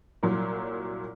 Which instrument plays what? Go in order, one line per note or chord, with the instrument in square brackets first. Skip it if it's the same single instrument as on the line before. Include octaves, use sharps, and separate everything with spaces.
[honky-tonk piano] C2 A#2 F#3